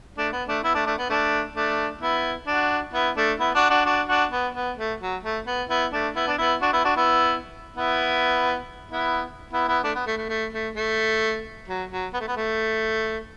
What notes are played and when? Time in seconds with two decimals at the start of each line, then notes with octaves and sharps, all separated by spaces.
0.18 A3 D4
0.33 B3
0.48 A3 D4
0.64 B3 E4
0.74 A3 D4
0.86 A3 D4
0.98 B3
1.09 A3 D4
1.55 A3 D4
2.01 B3 E4
2.47 D4 F#4
2.94 B3 E4
3.16 A3 D4
3.39 B3 E4
3.55 D4 F#4
3.70 D4 F#4
3.85 D4 F#4
4.08 D4 F#4
4.31 B3
4.54 B3
4.77 A3
5.00 F#3
5.23 A3
5.47 B3
5.69 B3 E4
5.92 A3 D4
6.15 B3 E4
6.27 D4
6.38 B3 E4
6.61 D4 F#4
6.73 B3 E4
6.84 D4 F#4
6.96 B3 E4
7.76 B3 E4
8.91 B3 E4
9.53 B3 E4
9.68 B3 E4
9.84 A3 D4
9.95 B3
10.07 A3
10.17 A3
10.29 A3
10.52 A3
10.75 A3
11.68 F#3
11.91 F#3
12.13 B3
12.20 A3
12.28 B3
12.36 A3